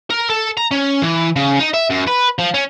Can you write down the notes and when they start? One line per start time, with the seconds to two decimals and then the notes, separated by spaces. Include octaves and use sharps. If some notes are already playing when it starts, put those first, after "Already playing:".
0.10 A#4
0.30 A4
0.57 A#5
0.71 C#4
1.02 E3
1.36 C#3
1.59 D#4
1.74 E5
1.90 F#2
2.08 B4
2.39 F3
2.54 C#4